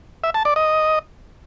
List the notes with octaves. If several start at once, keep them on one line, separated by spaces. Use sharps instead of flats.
E5
A5
D5
D#5